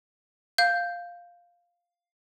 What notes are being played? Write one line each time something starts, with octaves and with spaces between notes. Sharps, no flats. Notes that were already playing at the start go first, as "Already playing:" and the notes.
F5 G6